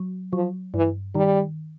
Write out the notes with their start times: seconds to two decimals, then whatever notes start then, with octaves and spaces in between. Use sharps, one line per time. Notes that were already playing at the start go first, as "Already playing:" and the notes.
Already playing: F#3
0.33 F3 F#3
0.74 G2 E3
1.15 D#3 G3